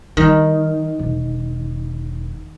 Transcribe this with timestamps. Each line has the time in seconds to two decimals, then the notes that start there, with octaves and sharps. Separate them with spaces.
0.17 D#3 G3
0.99 E1